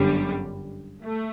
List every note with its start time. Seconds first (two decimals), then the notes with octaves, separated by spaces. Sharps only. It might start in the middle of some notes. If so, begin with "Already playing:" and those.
Already playing: G1 F#2 D3 G3
1.03 A3